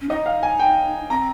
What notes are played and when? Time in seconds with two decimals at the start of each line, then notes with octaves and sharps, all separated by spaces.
0.01 C#4
0.10 D#4 D#5
0.26 F5
0.43 G#5
0.59 G5
1.10 C4 A#5